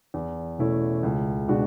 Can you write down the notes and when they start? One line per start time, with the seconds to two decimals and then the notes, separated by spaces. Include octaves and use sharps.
0.14 E2
0.58 B2 A3 C#4 E4
1.03 C#2
1.48 B2 G#3 D4 F#4